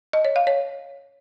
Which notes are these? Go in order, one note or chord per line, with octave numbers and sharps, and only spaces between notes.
D#5
C#5
F5
C#5